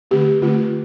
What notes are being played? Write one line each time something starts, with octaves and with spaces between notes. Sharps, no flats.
D3 A3 C4 G4
D3 A3 C4 F4